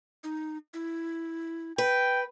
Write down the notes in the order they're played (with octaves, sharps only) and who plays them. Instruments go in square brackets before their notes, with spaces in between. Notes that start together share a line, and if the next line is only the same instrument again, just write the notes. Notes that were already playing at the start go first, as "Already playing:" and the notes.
[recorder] D#4
E4
[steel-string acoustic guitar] B4 [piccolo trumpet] G5